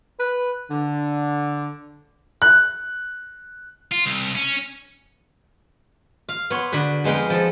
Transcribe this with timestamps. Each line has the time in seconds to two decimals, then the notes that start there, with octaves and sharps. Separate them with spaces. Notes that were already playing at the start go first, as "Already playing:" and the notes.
0.18 B4
0.69 D3
2.42 F#6
3.92 F4
4.05 C2
4.35 C#4
6.29 F5
6.50 B3 C#5 C6
6.72 D3 F#4 B4
7.04 F2 G#3 B3 F5 G5
7.30 F3 A4